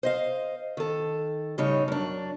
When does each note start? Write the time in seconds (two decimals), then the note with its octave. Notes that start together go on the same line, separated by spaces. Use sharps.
0.03 C5 D#5 F5
0.77 D#3 A4
1.58 A2 C#3 G3 D#4 C#5
1.88 F#2 D4